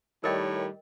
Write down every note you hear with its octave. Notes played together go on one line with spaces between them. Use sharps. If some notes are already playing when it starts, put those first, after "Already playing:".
A2 D#3 G3 A#4 C#5 D#5 G5